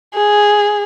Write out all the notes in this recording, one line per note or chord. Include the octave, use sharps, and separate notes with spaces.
G#4